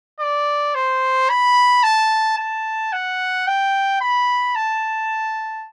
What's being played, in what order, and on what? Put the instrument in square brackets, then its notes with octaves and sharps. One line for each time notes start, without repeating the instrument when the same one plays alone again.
[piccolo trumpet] D5
C5
B5
A5
A5
F#5
G5
B5
A5